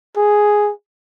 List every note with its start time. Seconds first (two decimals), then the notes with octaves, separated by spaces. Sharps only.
0.17 G#4